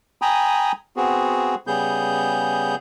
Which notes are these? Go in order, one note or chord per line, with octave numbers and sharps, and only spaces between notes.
G5 G#5 A#5 B5 D#6
B3 C4 F#4 G#4
C#3 G3 B3 G#4 G6